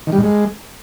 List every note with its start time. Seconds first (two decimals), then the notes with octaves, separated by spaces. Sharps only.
0.07 D#3
0.12 G3
0.18 G#2
0.23 G#3